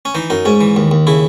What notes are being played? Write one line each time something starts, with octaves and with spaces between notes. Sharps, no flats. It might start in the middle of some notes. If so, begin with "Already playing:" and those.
C#4
E3 D#4
F#2 D#4
G#2 C#4
E3
D#2
D#2
C#3 E4